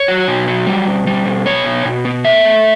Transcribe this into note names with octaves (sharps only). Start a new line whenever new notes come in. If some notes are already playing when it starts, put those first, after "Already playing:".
Already playing: C#5
F#3
B2
F#3
G3
B2
G3
B2
B3 C#5
B2
B2
B3
A3 E5
A3